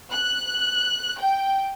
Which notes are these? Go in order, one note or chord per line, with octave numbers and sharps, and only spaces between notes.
F#6
G5